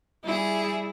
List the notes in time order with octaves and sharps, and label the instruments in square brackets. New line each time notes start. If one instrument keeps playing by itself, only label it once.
[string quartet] G3 G#4 [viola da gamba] E4